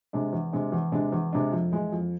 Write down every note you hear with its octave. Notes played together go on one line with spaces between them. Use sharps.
C3 G#3 D4
E2
C3 G#3 D4
E2
C3 G#3 D4
E2
C3 G#3 D4
F2
E3 G#3
F2